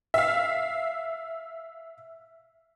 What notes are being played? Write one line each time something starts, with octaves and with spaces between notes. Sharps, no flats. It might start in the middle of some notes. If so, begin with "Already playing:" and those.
E5 F5